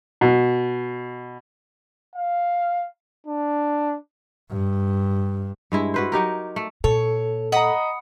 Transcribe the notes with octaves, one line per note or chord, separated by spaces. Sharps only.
B2
F5
D4
G2
G2 G#3 E4
F#4 B4 C5
F#3 D#4 G4 A#4
A3
A#2 A4 C#5
D#5 F#5 A#5 B5 D#6